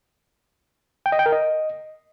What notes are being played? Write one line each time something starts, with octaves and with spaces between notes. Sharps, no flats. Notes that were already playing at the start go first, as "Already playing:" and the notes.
G5
D#5
G5
A#4
D#5